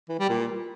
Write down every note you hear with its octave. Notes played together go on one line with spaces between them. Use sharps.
E3
G3
A#2